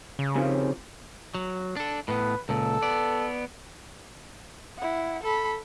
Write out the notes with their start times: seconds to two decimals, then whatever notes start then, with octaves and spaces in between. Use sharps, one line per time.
0.19 C#3
0.36 C3 D#3 F3
1.35 F#3
1.76 D4 A4
2.08 A2 B3 B4
2.49 C#2 A#2 A4
2.82 B3 D5
4.78 E4 F#5
5.23 A4 B5